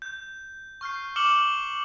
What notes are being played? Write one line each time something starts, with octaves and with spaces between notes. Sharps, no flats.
G6
C#6 F6 G6 C7
D6 F6 C#7 E7 F#7 G7